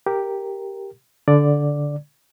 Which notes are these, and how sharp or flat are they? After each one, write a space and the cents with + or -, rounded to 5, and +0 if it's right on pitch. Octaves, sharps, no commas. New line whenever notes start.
G4 +0 A#4 +0
D3 -15 D5 +0